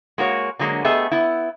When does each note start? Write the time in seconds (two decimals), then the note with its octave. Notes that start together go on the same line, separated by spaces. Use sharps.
0.18 G#3 A#3 F#4 C#5
0.59 D3 F#3 G#3 A#3
0.84 A3 B3 G4 G#4 D#5 E5
1.11 B3 E4